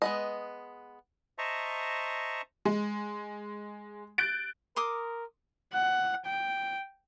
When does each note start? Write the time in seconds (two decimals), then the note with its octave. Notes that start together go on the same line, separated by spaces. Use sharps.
0.02 G#3 B3 D#5
1.38 C5 D#5 E5 A5 A#5 C#6
2.65 G#3
4.18 F#6 G6 A6 D7
4.76 A#4 C6 D6 D#6
5.73 F#5
6.26 G5